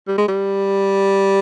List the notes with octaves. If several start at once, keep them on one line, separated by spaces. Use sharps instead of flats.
G3
G#3
G3